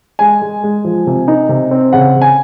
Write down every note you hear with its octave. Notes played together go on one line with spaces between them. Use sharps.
G#3 G#5
G#3
G#3
F3
C3
D#4
C3
C4
C#3 F#5
C#3
G#5